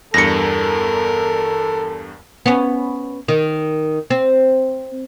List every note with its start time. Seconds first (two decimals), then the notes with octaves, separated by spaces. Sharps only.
0.14 E2 G2 A4 A#4 A#6 C#7
2.46 B3 C#4
3.28 D#3
4.10 C4